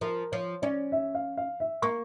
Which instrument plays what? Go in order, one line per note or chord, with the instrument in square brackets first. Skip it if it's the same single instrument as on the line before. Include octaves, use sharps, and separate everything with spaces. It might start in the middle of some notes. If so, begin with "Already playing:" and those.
[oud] F3 [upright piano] A#4
[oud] F3 [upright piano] C#5
[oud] C#4 [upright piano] D5
[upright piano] E5
F5
F5
E5
[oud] A#3 [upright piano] C#6